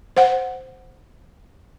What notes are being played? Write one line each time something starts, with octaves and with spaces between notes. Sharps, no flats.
C5 F#5